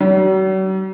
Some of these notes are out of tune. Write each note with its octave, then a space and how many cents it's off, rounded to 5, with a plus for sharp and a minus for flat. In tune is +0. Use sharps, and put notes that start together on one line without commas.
F#3 +45